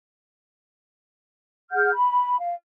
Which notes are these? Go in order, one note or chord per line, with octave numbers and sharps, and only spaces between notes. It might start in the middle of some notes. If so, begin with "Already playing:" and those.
G#4 F#5 F6 G6
B5
F5